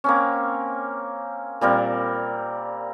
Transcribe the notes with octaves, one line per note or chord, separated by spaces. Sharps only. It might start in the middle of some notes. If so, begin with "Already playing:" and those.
A#3 C4 C#4
A#2 G3 C4 A#4